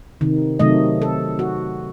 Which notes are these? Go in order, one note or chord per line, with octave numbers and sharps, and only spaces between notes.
C3 D#3
C3 D#3 F#3 A3 D#5
A4
F#4